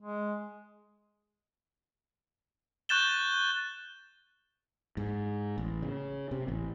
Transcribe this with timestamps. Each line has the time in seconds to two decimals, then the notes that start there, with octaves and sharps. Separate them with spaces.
0.01 G#3
2.89 C#6 F#6 G6 A6 E7 G7
4.97 G#2
5.58 A1
5.82 C#3
6.31 C3
6.48 A1